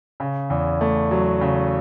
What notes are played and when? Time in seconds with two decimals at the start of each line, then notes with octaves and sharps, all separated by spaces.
0.20 C#3
0.50 E2
0.81 A3
1.11 F#3
1.41 C#3